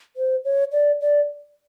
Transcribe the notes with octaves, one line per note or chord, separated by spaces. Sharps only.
C5
C#5
D5
D5